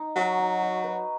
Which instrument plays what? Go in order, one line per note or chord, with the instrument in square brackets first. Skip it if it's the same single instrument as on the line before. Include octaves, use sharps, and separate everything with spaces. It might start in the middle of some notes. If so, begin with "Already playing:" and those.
Already playing: [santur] D#4
[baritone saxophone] F#3 [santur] F#4
[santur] D#4
D#4
B4